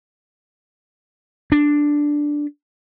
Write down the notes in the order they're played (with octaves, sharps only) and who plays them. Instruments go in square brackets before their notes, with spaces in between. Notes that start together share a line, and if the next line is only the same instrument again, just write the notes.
[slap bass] D4